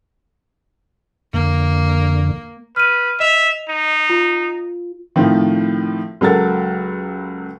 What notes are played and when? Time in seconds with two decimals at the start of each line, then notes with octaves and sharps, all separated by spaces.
1.33 F2 D3 A#3
2.76 B4 F6 D#7
3.20 D#5 E5 F7
3.70 D#4
4.10 F4
5.16 A2 D#3 F3 C4
6.21 C#2 F#3 A4 A#4 A6